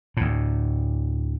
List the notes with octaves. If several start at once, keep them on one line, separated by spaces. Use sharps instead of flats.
D2 A2